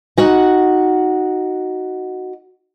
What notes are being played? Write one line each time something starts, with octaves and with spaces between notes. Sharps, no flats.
D#4 F#4 F#5